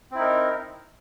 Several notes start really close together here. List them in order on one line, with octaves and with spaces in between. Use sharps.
C4 E4 D#4 A#4